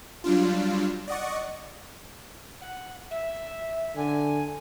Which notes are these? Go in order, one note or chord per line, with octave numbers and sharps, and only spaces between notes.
F#3 G3 D4 F4
D5 D#5 F#5 C#6
F#5
E5
D3 G#5